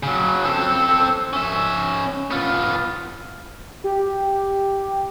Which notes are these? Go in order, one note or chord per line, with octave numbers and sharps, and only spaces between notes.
C#3 F#3
C4 A4
C#4 E5
B3 F4
G4